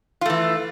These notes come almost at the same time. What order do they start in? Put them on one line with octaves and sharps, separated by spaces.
F4 A3 E3